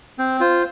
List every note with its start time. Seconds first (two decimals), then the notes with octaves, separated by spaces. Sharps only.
0.19 C4 C5
0.40 F4 C5